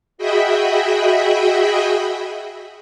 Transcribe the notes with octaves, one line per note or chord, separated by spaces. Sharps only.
F#4 G#4 D#5 E5 G5 B5